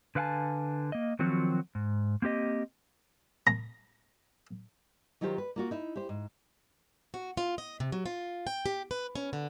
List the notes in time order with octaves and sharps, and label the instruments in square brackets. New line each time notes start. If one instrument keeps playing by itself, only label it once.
[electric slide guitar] D3 B4 F5 F#5 G#5 A5
A#3 D#5
D#3 F3 F#3 C4 F4 F#4
G#2
A#3 C4 G4 D#5
[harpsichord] A#5
[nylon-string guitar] D#3 F#3 E4 F4 G4 C5
B4
A#3 F4 F#4
D#4 E4
G4 C5
G#2
[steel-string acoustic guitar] F#4
F4
D#5
C3
F#3
F4
G5
G4
B4
C#4
D3